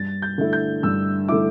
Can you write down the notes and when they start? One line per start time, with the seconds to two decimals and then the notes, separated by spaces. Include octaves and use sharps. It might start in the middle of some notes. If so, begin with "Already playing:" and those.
Already playing: G2 A6
0.22 G6
0.38 D3 A3 E4
0.53 G6
0.83 G2 E6
1.28 D3 A3 E4 D6